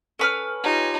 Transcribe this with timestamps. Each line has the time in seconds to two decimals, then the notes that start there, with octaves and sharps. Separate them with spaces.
0.19 C#4 A4 B4 F6
0.64 D#4 F4 G4 C#5